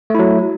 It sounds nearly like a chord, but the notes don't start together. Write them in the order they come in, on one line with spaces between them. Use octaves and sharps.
A3 E4 F#3